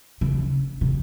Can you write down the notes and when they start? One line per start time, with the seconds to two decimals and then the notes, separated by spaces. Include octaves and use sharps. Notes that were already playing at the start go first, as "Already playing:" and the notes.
0.21 C#3
0.81 C3